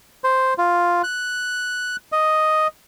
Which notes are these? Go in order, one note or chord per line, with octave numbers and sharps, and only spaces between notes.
C5
F4
F#6
D#5